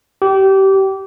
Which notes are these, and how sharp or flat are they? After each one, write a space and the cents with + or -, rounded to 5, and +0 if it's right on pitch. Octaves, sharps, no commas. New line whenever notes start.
G4 -25